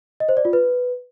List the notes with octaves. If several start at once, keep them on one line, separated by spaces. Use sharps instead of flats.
D#5
C5
D5
F4
B4